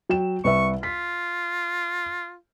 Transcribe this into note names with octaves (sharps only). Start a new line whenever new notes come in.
F#3 G5 E7
C2 B4 E5 C#6
F4 B6